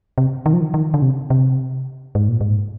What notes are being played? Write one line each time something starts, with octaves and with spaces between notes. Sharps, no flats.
C3
D#3
F3
D#3
D#3
D3
C3
C3
G#2
A#2
G#2